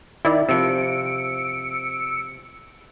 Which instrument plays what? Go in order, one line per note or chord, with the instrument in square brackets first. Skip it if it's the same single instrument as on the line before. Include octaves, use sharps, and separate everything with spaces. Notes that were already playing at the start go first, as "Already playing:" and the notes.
[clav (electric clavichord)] D#3 [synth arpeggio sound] E4 D5 E5
[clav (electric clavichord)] C3 F3 [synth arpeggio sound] E6 C#7 D7